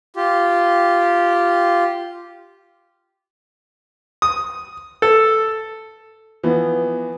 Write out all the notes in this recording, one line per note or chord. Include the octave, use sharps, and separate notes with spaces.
F4 G4
D#6
A4
E3 F3 B3